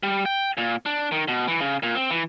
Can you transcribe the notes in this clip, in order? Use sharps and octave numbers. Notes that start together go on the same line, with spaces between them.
G3
G5
A#2
D4
D#3
B2
E3
C#3
A#2
C4
E3